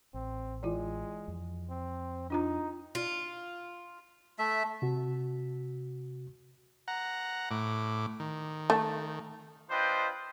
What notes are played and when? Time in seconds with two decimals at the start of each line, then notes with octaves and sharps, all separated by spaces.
0.14 A1 C4
0.63 E3 G#3 E4 F4
1.28 F2
1.70 C4
2.30 D4 D#4 F4 A#5
2.95 F4
4.39 A3 E5
4.82 C3 F#4
6.88 F#5 A#5
7.51 A2 D6
8.20 D#3
8.70 A3
9.71 D4 F4 B4 C5 D#5 G5